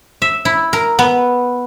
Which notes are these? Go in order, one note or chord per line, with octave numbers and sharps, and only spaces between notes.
E5
E4
A#4
B3